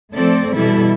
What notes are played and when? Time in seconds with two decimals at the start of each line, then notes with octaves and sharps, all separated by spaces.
0.14 F3 A3 C4 A4 D5
0.57 B2 E3 G3 E4 A4